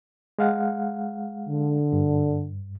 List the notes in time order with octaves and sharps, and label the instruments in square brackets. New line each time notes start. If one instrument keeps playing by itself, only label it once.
[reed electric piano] G#3 F5 F#5
[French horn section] D3
[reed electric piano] G2